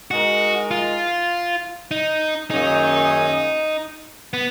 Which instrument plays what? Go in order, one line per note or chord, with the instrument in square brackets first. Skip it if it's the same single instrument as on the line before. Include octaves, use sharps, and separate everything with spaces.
[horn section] G#3 D#4 A#4 [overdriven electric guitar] F#4
[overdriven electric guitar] F4
D#4
[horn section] F#2 D#3 A#3 C#4 G#4 [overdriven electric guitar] D#4
[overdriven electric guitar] B3